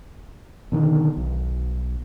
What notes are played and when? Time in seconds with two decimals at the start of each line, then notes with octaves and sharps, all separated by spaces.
0.72 B2 D3 D#3
1.17 B1